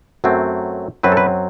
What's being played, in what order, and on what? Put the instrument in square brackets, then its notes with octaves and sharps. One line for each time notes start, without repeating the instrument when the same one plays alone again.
[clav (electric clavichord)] F#2 F#3 A3 C4
F#2 F#3 C4 B4
A4
B4